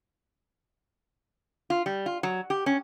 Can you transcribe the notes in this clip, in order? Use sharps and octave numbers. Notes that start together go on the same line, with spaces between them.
F4
G3
F4
F#3
G4
C#4